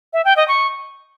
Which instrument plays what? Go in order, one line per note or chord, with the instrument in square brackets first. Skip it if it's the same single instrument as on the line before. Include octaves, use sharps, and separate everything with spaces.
[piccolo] E5
G5
D#5
C#6